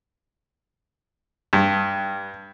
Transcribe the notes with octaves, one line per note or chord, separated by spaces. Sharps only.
G2